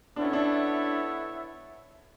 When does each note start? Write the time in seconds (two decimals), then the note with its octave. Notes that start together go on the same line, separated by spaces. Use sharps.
0.16 B3 D4 E4 A4 C#5 E5
0.24 C#4
0.33 D4